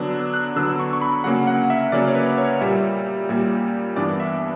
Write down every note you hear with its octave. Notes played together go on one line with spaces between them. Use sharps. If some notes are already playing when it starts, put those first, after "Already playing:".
Already playing: D3 F#3 B3 D4
E6
F#6
D3 F#3 B3 D4 E6
C#6
C#6
B5
C#3 F#3 A#3 C#4 F#5
F#5
E5
C#3 F#3 A#3 C#4 D5
C#5
B4
C#5
A#2 G3 A#3 E5
A#2 G3 A#3
G2 E3 B3 D4 D5
E5